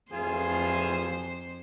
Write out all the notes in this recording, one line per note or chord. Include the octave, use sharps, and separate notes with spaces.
A1 F2 F4 G#4 C5